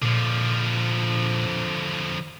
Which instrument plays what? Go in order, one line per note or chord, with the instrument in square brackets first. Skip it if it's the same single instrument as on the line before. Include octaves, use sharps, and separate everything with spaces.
[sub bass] A#2 [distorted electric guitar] D3 F3